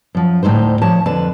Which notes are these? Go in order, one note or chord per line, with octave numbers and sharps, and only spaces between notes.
F#2 F3
D2 A2 C#3 D#4 C5
F3 C#5 A5
F2 D3 B4 A5